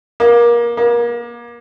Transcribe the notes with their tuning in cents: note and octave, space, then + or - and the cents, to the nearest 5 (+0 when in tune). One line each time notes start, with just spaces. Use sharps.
A#3 +25
A#3 +30